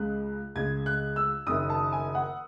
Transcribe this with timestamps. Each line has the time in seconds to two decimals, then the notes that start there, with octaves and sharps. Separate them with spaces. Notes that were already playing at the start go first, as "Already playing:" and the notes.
Already playing: C#2 C#3 G#3 F#6
0.55 C#2 C#3 G#3 G#6
0.86 F#6
1.16 E6
1.47 F#1 F#2 D#3 D#6
1.70 A5
1.92 G#5
2.15 F#5